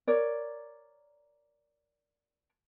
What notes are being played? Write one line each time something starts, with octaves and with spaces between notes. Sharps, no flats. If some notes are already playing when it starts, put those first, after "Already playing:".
A#4 C#5 D5